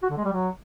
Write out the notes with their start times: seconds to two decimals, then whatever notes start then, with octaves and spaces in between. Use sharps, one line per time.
0.02 F#4
0.10 D3
0.17 G#3
0.25 G3
0.32 F#3